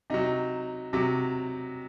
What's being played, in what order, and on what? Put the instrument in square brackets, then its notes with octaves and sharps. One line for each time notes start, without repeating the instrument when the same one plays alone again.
[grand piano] C3 F#3 D#4
C3 F#3